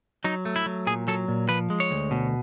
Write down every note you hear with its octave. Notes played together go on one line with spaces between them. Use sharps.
F#3 D#4
A3
E4
F#3
A#2 G#4
F#3 A4
A#2
F3 B4
G#3
C#5
D2
B2